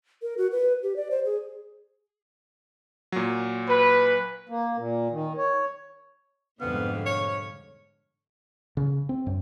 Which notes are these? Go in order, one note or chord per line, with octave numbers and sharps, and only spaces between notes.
A#4
F#4
B4
G4
D5
C5
G#4
A#2 F#3
B4
A#3
A#2
D#3
C#5
F2 G#2 B2 D3 G3 B3 F5
C#5
C#3
C4
F#2